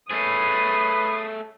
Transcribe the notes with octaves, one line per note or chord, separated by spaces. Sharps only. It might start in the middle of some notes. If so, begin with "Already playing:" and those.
A3 G#4 B4 C#5 D#6 C7